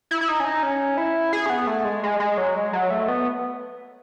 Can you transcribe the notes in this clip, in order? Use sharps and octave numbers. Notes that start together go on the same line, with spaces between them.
E4
E4
D#4
C#4
D#4
C#4
E4
G#4
C#4
B3
A3
G#3
G#3
G#3
F#3
G#3
F#3
A3
B3